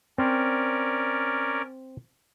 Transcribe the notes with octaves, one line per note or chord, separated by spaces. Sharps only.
C4 C#4 A#4 C5 D5